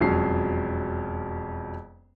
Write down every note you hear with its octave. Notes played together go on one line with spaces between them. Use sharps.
E1 F2 F#3 C#4 C7